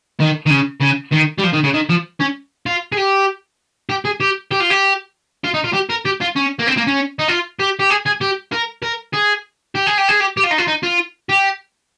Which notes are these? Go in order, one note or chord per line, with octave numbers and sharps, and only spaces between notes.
D#3
D#3
C#3
C#3
D#3
G3
F3
D#3
C#3
D#3
F3
C#4
F4
G#4
G4
G4
G#4
G4
G4
F4
G4
F4
D#4
F4
G4
A#4
G4
F4
C#4
A#3
C4
A#3
C#4
D#4
F4
G4
G4
G#4
G#4
G4
A#4
A#4
G#4
G4
G#4
G4
G#4
G4
G4
F4
D#4
F4
D#4
F4
G4